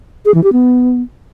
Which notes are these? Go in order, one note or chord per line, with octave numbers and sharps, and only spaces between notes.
G#4
E3
G4
B3